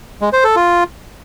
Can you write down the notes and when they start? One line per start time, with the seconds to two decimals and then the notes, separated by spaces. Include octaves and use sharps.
0.21 G#3
0.33 C5
0.44 A4
0.56 F4